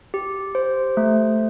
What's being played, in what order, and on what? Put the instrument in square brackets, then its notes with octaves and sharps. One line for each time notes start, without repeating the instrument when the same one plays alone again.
[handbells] G4
C5
A3